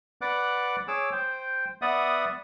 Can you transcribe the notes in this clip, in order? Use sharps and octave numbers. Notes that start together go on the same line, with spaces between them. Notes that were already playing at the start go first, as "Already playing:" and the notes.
B4 D5 F#5 D6 F#6
G#4 C#5 D6 E6
C5 G5
B3 D5 E5 F#5 D#6